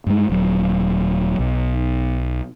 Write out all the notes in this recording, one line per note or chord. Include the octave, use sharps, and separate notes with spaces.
G2 G#3
D#1 F#3
B1